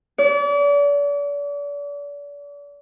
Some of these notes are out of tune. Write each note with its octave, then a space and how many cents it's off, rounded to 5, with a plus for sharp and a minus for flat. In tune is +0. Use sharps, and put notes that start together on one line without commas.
D5 -40